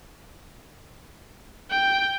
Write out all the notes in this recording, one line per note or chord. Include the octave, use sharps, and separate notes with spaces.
G5